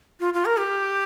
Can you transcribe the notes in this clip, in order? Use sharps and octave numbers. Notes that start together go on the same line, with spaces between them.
F4
F4
A#4
G4